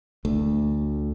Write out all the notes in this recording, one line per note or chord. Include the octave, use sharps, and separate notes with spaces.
D2 A3